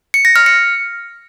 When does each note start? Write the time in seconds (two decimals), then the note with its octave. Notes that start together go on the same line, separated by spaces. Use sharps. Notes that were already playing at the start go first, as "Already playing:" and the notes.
0.14 C#7
0.25 A#6
0.36 F6
0.46 C#7